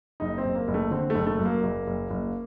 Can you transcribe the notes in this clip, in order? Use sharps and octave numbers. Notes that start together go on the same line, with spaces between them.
F#1 D#4
C4
F#1
A#3
F#1
A3
D3 C4
A3
F#1
A3
F#2
A#3
F#1 A#3
F#1
F#1